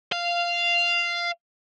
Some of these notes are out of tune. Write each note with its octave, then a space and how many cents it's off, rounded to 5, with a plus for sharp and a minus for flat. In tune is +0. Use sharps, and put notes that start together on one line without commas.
F5 -10